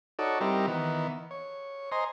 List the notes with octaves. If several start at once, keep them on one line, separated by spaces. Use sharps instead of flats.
D#4 F#4 A4 C#5 D5
G3 C4 D#4 E4 G4 A#4
D#3 E3 B3
C#5
C5 D#5 G#5 A#5 C6